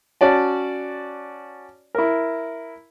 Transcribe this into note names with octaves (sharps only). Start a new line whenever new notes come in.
C#4 F#4 D5 A5
E4 A#4